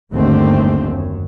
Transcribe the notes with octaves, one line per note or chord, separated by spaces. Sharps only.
G1 D#2 G#2 D3 A3 C4
F#2